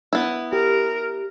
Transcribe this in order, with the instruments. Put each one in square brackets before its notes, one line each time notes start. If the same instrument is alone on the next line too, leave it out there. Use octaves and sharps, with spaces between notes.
[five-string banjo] B3 E4
[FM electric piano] G4 [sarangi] A#4